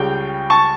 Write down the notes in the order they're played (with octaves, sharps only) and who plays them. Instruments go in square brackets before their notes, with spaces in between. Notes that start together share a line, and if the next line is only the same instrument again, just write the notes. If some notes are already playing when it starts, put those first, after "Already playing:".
Already playing: [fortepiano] C#2 C#3 G3 G5
A5 C#6